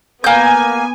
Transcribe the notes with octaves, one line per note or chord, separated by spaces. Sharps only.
A#3 B3 G#5 G6